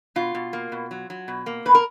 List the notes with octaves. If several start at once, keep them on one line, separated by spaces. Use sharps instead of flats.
B2 F4
B2
A#3
B2
F#3
F#3
B2
A#3
B2 B4
A#4